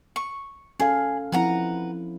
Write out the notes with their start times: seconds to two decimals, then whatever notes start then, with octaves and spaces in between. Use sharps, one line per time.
0.16 C#6
0.80 C#4 G#4 A4 F5
1.32 F3 C4 E4 B4 F#5 A#5